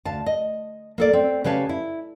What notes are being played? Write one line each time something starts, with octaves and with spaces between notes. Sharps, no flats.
D2 F5 A5
D#5
A#3 A4 D5
C4
C#3 G4 B4 C#5 F5 A5
E4